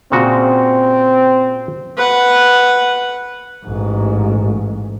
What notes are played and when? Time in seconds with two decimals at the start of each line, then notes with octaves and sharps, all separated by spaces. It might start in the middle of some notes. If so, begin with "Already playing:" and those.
0.12 A#2 C#3 C4 F#4
1.97 B4 F#5
3.65 A1 G#2